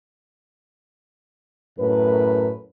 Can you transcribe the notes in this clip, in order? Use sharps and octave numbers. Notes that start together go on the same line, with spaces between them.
F#2 A2 A#4 B4